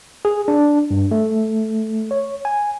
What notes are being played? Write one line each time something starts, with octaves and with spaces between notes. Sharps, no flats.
G#4
D4
G2
A3
C#5
G#5